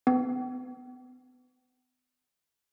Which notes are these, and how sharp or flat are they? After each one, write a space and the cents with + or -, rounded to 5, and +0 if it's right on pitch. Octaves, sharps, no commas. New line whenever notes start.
B3 +35